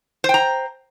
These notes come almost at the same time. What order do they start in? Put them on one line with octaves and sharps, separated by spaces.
C5 G5 A#5